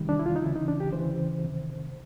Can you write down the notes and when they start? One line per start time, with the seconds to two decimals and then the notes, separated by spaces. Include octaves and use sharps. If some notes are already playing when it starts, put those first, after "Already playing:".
Already playing: E2 C3 D#3 G3
0.09 D4
0.19 E4
0.26 F4
0.36 D#4
0.42 D2 C#3 E3 E4
0.56 D#4
0.68 D4
0.80 G4
0.93 D2 C#3 E3 C5
1.43 F2 C3 D#3